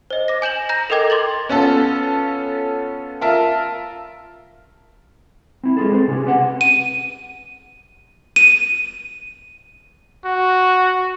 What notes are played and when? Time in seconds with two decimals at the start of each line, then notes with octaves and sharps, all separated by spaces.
0.10 C5 D#5
0.28 D6 A#6
0.42 G#5 G6 E7 F#7
0.69 A#5 G6 A#6
0.90 A4 A#4 D#5 G5 D6 G#6
1.10 C6 D6 A6 F#7
1.49 B3 C#4 F4 A4
3.21 F4 A#4 E5 A5
5.63 C4 E4
5.77 G#3 C4 F4 G#4 A4
5.92 C4 B4 C5
6.08 C3 C#4 F4 G4 G#4
6.25 G4 B4 F#5
6.61 D#7
8.36 D#7
10.25 F#4